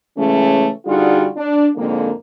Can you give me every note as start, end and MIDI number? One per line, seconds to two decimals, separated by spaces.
0.18 0.69 49
0.18 0.69 52
0.18 0.69 56
0.18 0.69 57
0.18 0.69 61
0.86 1.27 50
0.86 1.27 55
0.86 1.27 63
0.86 1.27 65
0.86 1.27 66
0.86 1.27 68
1.37 1.68 62
1.76 2.11 41
1.76 2.11 44
1.76 2.11 50
1.76 2.11 58